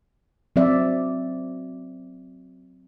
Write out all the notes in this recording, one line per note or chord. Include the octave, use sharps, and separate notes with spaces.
F#3 C4 D5 E5